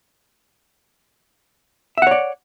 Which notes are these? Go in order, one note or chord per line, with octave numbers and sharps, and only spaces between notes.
C#5 D5 E5 F#5